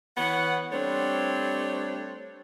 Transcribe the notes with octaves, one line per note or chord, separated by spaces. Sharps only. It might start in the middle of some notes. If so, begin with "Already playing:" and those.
E3 B3 C#5 F#5
G3 A3 C4 D4 C5 C#5